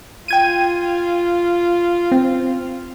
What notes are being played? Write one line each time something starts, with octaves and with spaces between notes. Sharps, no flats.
F4 G5 G#6 D#7
C4